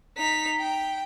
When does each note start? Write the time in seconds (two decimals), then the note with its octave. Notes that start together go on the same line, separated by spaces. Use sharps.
0.18 D#4 B6
0.60 G5